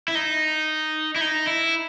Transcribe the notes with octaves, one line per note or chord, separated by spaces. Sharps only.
E4
D#4
E4
D#4
E4